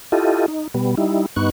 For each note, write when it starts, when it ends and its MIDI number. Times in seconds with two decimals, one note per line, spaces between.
0.12 0.46 64
0.12 0.46 65
0.12 0.46 67
0.12 0.46 69
0.12 0.46 75
0.48 0.68 63
0.74 0.95 47
0.74 0.95 55
0.74 0.95 59
0.97 1.26 55
0.97 1.26 63
0.97 1.26 64
1.36 1.50 43
1.36 1.50 59
1.36 1.50 63
1.36 1.50 85
1.36 1.50 90